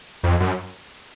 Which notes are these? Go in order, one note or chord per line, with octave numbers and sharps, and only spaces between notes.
F2
F#2